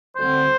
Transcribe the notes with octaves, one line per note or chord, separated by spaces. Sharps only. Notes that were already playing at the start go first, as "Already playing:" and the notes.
D2 D3 G3 C4 C5